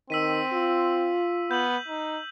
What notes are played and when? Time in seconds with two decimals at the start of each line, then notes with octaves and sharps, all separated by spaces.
0.10 D#3 C4 E6 B6 D#7
0.53 F4
1.51 B3 G6 F#7
1.88 D#4